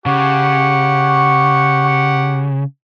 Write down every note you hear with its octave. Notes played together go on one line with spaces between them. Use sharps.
C#3 G4 F#5 C#6